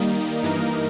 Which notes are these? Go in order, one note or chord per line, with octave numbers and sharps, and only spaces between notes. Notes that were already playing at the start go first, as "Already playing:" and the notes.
Already playing: D#3 G3 A#3 D#4
G2 E3 A#3 D#4 A#4